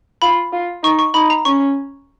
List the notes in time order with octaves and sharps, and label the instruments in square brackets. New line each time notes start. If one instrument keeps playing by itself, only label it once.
[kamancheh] F4 [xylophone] B5
[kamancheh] F4
[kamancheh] D#4 [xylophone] C#6
[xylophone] C#6
[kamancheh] D#4 [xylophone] B5
[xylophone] A#5
[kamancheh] C#4 [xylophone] C#6